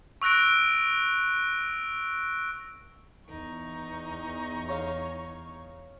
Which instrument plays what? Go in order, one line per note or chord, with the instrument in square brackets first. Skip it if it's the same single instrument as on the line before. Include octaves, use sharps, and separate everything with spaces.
[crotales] C#6 E6 F#6 A#6 D7
[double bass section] E2 [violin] D#4 C#6
[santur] C#5 F5